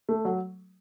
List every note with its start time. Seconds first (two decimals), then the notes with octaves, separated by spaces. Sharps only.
0.09 A3
0.25 F#3